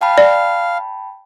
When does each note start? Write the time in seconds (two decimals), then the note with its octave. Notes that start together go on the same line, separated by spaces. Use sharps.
0.01 F5 G5 A5 B5
0.18 D5